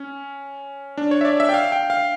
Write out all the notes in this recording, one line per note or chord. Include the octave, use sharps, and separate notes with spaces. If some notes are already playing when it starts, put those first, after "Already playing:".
Already playing: C#4
D4
C#5
E5
D5
E5
G5
F5
G5
F5